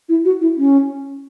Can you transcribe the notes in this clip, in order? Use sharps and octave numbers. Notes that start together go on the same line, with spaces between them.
E4
F#4
E4
C#4